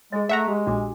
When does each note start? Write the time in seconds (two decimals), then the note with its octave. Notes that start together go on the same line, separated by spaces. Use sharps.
0.12 G#3 G#4 D#5
0.29 A3 E5 F#5 A#5
0.48 G#3 G4
0.67 A#1 D4 F#4 D6